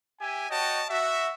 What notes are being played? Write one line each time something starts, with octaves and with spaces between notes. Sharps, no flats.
G4 E5 G#5
F#4 C#5 D#5 G5 A5
F#4 E5